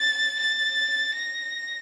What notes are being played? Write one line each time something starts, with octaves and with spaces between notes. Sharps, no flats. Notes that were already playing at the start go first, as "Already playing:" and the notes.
Already playing: A6
A6
A#6